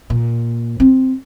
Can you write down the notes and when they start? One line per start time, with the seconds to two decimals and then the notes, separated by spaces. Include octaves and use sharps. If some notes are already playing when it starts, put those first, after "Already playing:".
0.10 A#2
0.80 C4